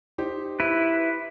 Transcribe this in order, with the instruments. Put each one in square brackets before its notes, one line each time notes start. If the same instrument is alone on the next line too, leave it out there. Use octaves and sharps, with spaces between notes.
[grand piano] D#4 G4 C5
[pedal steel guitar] E4 B4